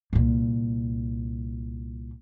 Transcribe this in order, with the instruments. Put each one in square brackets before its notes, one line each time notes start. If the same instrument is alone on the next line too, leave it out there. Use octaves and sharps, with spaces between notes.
[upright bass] C2 A#2